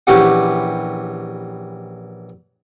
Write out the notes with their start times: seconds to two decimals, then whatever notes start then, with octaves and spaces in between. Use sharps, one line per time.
0.07 A#1 E3 C#4 G4 F#5